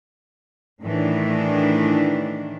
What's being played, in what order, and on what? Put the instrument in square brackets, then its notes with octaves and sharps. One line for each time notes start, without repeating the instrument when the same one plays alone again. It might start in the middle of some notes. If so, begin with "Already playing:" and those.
[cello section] A2 D#3 E3 A3 D4